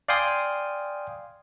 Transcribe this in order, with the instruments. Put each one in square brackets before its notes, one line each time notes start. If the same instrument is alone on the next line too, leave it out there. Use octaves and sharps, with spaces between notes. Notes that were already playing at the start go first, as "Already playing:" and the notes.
[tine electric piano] D5 F5 G5 G#5 C6 D#6